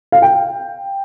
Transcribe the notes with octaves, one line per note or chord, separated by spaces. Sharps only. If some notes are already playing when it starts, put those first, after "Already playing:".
F5
G5